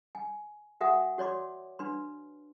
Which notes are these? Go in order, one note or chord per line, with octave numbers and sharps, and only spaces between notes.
G#5
F#4 A#4 E5 F#5 G#5 D#6
F#4 C#5 D5 C6 D6
D4 B4 C6